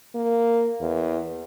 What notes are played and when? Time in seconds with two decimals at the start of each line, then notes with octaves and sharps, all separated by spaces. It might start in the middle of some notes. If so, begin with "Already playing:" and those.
0.15 A#3
0.81 E2